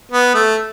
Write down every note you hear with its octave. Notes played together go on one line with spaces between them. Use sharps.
B3
A3